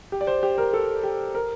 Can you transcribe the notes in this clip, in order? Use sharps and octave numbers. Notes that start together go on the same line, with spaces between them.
G4
D5
C5
G4
A#4
A4
G4
A#4